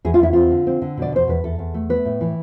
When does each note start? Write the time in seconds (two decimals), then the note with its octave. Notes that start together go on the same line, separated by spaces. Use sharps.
0.05 E2 G#4
0.14 F4
0.20 E2 E4
0.33 C4 F4
0.51 D3
0.67 C4
0.82 D3
0.97 B2 D5
1.12 E2 C5
1.28 E2 B4
1.44 E2 A4
1.59 E2
1.74 A3
1.89 B3 B4
2.05 A2
2.21 E3